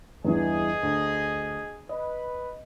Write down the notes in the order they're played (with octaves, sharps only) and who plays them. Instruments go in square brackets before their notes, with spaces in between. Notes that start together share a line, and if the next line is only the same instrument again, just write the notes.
[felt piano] E2 G2 E3 [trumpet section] G#4 D#5
[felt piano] D2
[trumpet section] B4 [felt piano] D#5